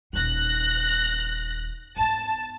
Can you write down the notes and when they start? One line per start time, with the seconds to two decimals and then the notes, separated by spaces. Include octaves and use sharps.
0.13 D#1 D#4 F#6 A#6
1.97 G#2 B3 A5